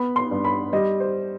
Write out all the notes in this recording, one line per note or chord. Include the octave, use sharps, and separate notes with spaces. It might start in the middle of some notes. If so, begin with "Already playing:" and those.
Already playing: B3 B5
C6
G2
B5
G3 D#5
C5